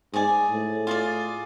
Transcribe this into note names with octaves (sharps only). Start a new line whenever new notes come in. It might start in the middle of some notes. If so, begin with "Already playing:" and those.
G#2 G#4 D5 G#5
A2
F4 G#4 D5